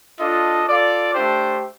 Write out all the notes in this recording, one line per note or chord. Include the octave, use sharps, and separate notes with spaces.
D4 F4 A4 D#5
F4 A4 D5 F5
A3 D4 G4 C5